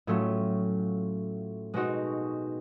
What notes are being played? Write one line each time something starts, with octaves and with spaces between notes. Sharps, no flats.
A2 F#3 A3 C#4 F4
B2 G#3 C4 D#4 F#4